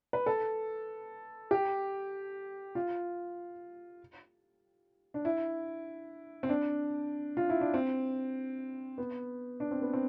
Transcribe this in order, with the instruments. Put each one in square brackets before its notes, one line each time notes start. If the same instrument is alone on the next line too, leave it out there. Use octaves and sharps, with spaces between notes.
[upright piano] B4
A4
G4
F4
D4
E4
C4
D4
F4
E4
D4
C4
B3
D4
C4
B3
C4